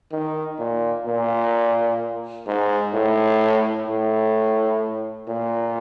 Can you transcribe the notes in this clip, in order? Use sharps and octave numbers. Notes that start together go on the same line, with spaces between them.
D#3
A#2
A#2
G#2
A2
A2
A#2